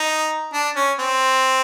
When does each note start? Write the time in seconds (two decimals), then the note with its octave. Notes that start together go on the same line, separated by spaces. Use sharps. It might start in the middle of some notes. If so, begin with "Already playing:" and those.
Already playing: D#4
0.53 D4
0.76 C#4
0.99 C4